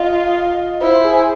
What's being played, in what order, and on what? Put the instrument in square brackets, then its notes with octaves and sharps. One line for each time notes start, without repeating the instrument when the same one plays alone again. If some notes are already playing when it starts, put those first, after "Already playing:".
Already playing: [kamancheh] F4 [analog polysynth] D#5
[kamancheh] E4 [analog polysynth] C5
[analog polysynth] G#4